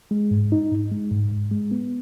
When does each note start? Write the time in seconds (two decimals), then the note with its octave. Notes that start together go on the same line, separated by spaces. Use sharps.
0.11 G#3
0.31 G#2
0.52 D#4
0.72 G#2
0.92 G#3
1.11 G#2
1.31 G#2
1.51 G#3
1.71 B3